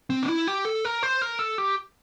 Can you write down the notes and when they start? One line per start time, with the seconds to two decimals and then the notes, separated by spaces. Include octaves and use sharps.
0.10 C4
0.23 D4
0.29 E4
0.47 G4
0.65 A4
0.85 A#4
1.03 C5
1.22 A#4
1.39 A4
1.58 G4